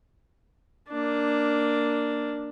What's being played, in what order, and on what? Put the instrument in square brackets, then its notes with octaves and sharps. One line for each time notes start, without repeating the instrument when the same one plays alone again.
[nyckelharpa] A#3 D4